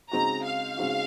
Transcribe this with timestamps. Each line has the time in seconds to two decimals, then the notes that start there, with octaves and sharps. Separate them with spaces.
0.11 C#3 G#3 C4 D#4 F#4 A#5
0.44 F5
0.77 C#3 G#3 C4 D#4 F#4